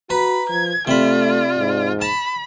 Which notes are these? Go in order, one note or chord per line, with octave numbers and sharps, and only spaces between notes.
F#4 B4 A#5 B5
F3 G#6
C3 A3 F4 D5 B5
G#2
A5 B5